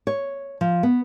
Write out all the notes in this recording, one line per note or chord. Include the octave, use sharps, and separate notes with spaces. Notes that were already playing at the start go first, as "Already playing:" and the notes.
C#5
F3
B3